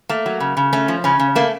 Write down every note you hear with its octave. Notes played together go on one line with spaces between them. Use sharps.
A3 A#3
F#3
C#3
C#3
A3 C#4
F3
C#3 C#4
C#3
A3 A#3